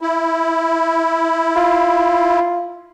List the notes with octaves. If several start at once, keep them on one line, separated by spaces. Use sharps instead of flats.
E4
F4